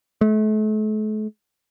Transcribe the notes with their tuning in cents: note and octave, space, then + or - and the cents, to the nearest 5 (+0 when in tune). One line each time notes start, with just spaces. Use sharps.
A3 -40